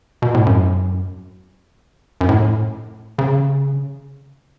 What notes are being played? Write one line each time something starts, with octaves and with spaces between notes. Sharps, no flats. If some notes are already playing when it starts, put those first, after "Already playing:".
B2
A2
F#2
F#2
A2
C#3